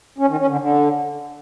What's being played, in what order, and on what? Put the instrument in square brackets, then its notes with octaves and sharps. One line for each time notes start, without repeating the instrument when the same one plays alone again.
[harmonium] C#4
D#3
C#4
D3
D3